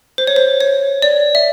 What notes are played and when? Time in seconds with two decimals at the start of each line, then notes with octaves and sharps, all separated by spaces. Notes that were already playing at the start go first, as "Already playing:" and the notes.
0.18 C5
0.27 C#5
0.36 C5
0.60 C#5
1.02 D5
1.35 E5